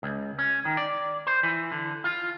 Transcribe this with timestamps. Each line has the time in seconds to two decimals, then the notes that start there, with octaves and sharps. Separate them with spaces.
0.03 C#2
0.39 C#4
0.65 D#3
0.77 D5
1.27 C5
1.43 E3
1.72 D3
2.04 F4